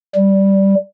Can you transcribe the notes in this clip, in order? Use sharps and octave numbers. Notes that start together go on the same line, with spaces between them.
G3